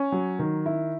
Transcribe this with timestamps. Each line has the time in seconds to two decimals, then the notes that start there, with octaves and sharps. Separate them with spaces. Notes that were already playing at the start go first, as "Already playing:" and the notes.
Already playing: C#4
0.12 F#3
0.39 D#3
0.66 E4